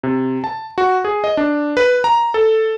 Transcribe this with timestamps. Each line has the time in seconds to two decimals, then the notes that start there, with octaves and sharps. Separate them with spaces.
0.03 C3
0.44 A5
0.78 F#4
1.05 G#4
1.24 D#5
1.37 D4
1.77 B4
2.04 A#5
2.34 A4